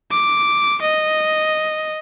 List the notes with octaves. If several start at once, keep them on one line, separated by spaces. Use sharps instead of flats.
D6
D#5